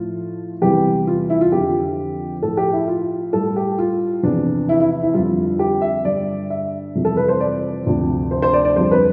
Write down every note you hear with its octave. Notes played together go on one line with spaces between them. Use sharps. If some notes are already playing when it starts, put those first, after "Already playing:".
Already playing: A2 F3 F4
E2 C3 E3 G3 G4
F4
E4
F4
F2 D3 F3 G4
A2 F3 A4
G4
E4
F4
A2 G3 A4
G4
F4
E2 C3 F3 D4
E4
E4
E4
E4
F2 D3 G3 F4
G4
E5
G2 D3 G3 D5
E5
F2 C3 E3 G3
A4
B4
C5
D5
D2 C3 F3
C5
C5
D5
D5
F2 D3 G3 C5
B4